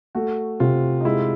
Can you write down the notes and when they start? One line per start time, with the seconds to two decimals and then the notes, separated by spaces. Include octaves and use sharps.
0.15 A3 F#4
0.60 C3 F4
1.00 D#4
1.05 G#3 E4